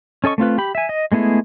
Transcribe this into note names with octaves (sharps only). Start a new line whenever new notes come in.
C#4 A4 D#5 C#6
A3 C4 F4 B4
G4 B5
E5 G#5
D#5
G#3 A3 B3 E4 G#4